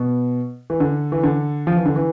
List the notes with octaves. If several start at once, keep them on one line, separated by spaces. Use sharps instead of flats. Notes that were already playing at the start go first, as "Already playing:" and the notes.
Already playing: B2
E3
D3
E3
D3
F3
E3
D3
E3